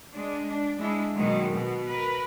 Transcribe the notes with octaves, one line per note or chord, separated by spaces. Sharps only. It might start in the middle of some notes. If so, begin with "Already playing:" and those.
G#3 D4
D4
G#3 D4 E4
B2 D#3 F#3 G#3 A#3
B2 B3
A#4 B4